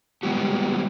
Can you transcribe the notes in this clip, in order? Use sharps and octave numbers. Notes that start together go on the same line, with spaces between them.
G3 G#3 B3 F#4 G4